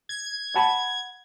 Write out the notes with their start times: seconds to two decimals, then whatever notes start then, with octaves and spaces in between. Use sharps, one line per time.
0.09 G#6
0.56 F#5 A5 B5